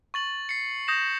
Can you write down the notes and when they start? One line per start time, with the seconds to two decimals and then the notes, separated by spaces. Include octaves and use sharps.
0.14 C#6 A6 F#7
0.49 C7 C#7
0.88 D#6 G6 A#6 E7